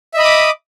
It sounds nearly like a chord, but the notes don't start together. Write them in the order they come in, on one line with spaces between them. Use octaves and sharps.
E5 D#5 B5 D#6 D6